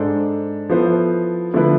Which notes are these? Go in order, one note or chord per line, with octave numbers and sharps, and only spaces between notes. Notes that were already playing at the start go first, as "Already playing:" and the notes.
Already playing: G#2 G#3 D4 A4 C5
F3 B3 E4 A4 C5
D3 F3 A3 E4 B4